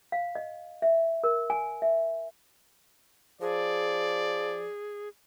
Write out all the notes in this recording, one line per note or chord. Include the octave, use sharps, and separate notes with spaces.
F5
D#5
E5
A#4
G#5
E5
F3 G#4 D5